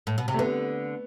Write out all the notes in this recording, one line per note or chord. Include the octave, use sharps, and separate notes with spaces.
A2
B2
C3
A3
D3 B3